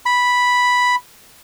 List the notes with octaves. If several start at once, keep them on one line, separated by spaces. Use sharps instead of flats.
B5